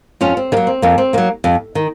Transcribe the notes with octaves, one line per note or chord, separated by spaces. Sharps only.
F2 C#4 F4
C4
D#3 F#3 A#3
C4
F2 A#3
C4
D#3 F#3 A#3
F2
D#3